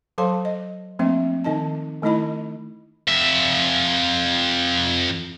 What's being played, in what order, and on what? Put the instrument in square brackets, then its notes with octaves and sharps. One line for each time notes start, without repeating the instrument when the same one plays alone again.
[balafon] F#3 A4 C5 F5 A5 C6
D#5
F3 A3 A#3 C4 D4 E5
D#3 D#4 D#5 A5
D#3 A3 D#4 E4 D#5 B5
[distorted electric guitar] F2 E5